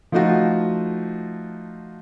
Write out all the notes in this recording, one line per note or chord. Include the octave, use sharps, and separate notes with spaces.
F3 A3 D#4 F4 F#4